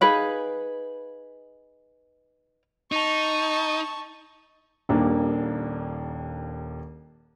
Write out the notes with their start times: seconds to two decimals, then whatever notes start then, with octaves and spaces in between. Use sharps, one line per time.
0.01 D#4 G#4 B4 F5
2.92 D#4 A5 C#6
4.89 D#1 D#2 A#3 D4